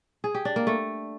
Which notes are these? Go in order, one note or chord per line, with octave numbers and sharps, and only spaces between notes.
G#4
G4
D4
A#3
A3